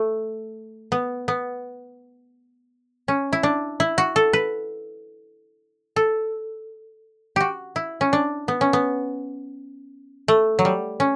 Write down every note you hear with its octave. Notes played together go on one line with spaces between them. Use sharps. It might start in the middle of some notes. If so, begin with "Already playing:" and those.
Already playing: A3
B3
B3
C#4
E4
D4
E4
F#4
A4
B4
A4
F#4 G4
E4
C#4
D4
B3
C#4
B3
A3
F#3
G3
C#4